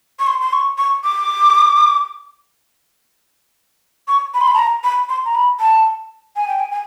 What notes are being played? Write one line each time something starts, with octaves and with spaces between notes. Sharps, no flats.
C#6
C6
C6
C#6
C#6
D6
C#6
B5
C6
B5
A5
A#5
B5
C6
A#5
B5
A5
G#5
G5
G#5
G#5